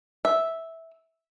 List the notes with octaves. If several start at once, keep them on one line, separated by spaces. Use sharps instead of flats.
E5